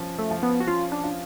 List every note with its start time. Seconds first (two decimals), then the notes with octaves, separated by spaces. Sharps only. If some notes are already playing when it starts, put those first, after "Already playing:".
Already playing: F3 C#4
0.19 A3
0.31 F3
0.43 B3
0.60 F#4
0.67 C#4 F4
0.92 D4
1.04 F4